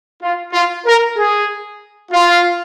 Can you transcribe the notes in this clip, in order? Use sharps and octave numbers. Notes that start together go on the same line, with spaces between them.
F4
F4
A#4
G#4
F4